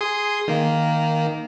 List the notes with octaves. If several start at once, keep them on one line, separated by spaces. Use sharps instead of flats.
G#4 C6 D#6
D#3 A#3